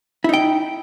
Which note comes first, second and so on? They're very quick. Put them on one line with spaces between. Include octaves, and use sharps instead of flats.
E4 D#4 G5